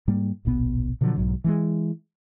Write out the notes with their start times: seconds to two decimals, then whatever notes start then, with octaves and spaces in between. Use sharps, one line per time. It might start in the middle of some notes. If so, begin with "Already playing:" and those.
0.08 G#2 G3 A#3
0.45 D1 A#1 B2 B3
1.01 B2 D3 F3 F#3
1.16 B1 G#2 F#3
1.44 E3 G3 G#3